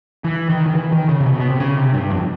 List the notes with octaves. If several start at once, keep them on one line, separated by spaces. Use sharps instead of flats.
E3
D#3
D#3
E3
D#3
C#3
C3
B2
B2
C3
C#3
C3
G2
F2